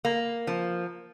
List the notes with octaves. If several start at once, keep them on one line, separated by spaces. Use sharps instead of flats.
A#3
F3